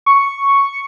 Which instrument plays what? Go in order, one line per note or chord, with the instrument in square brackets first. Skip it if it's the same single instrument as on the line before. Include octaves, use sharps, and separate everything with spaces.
[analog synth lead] C#6